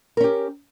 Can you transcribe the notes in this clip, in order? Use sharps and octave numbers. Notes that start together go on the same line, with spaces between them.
C#4 G4 A#4